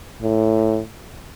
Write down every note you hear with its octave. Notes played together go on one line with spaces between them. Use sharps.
A2